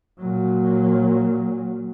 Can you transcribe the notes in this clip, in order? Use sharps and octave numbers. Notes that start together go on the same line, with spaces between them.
A#2 F#3